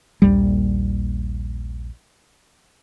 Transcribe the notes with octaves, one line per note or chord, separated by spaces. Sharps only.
A#1 D#2 G3